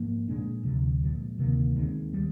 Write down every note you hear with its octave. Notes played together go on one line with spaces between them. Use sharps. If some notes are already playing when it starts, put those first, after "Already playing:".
Already playing: G#2 F3 A#3
A#2 G#3 D4
D2 C3 F3
A#2 F3 G#3
D2 C3 D#3 A#3
D#2 D#3 G#3 C4
D#3 G3